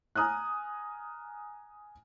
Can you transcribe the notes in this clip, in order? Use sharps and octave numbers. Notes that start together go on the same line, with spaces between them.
G#5 A#5 D#6 F6 F#6